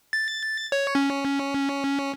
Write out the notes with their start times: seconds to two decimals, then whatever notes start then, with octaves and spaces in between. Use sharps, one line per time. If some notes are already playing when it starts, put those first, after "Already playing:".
0.13 A6
0.72 C#5
0.95 C#4